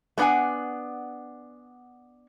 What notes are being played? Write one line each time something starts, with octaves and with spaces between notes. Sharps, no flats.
A3 B3 D4 F#5 G#5